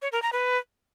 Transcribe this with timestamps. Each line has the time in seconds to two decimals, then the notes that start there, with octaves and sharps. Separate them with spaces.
0.02 C#5
0.12 A#4
0.22 A#5
0.33 B4